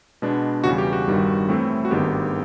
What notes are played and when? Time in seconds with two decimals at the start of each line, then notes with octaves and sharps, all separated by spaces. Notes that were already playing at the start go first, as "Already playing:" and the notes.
0.22 B2 G#3 B3 D4
0.64 E2 C#3 E3 G3 F#4
0.78 G4
0.93 F#4
1.07 G1 G2 D#3 G3
1.49 A2 E3 A3 C4 E4
1.85 F#4
1.91 G#1 G2 D#3 G#3 B3 G4